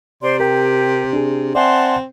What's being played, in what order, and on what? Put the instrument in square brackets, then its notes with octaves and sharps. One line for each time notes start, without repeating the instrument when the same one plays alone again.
[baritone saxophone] C3 [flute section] C5 D5 C6
[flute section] G4 [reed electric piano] A#4 G5
[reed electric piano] D4 G#4
[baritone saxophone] C4 [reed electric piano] D5 E5 G#5 [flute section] F#5 A5 C6